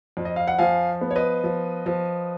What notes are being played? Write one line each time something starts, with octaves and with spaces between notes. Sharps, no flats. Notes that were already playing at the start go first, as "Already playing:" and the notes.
F2
D#5
F5
F#5
F3 F5 G#5
B3
C#5
B4 D#5
F3
F3